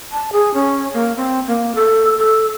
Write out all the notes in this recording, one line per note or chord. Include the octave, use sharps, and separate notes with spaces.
A5
G#4
C#4
A#3
C4
A#3
A4
A4